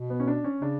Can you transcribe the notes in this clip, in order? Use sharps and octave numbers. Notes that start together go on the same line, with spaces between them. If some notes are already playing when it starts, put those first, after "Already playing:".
Already playing: B2
B3
C#4
D4
C#4
C#3 D4